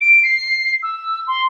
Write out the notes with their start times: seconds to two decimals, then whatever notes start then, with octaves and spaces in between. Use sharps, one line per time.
0.01 D7
0.23 C7
0.83 E6
1.27 C6